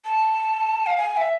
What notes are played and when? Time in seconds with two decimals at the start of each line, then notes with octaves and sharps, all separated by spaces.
0.05 A5
0.86 F5
0.98 G#5
1.17 E5